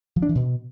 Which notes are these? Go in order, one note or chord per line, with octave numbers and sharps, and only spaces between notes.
F3
D4
E3
B2